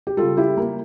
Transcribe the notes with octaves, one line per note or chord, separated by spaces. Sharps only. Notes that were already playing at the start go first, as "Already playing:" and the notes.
G4
C#3 G3 F4 A4
E4 G4
A#3